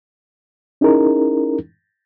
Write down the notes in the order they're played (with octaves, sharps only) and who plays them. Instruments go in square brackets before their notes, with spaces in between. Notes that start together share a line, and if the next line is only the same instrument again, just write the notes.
[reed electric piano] C#4 D#4 E4 G#4 A#4